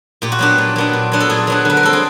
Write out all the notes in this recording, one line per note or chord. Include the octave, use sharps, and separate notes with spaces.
A#2 G4
F#4
F#3 B3 D4 G4
A#2
F#3 B3 D4
A#2
F#3 B3 D4
A4
A#2 G#4
F#3 B3 D4
D3 B4
A#4
G3 C4 A4
G#4